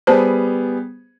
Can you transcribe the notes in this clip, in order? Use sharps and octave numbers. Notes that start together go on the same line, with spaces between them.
G3 B3 G#4 B4 C5 A5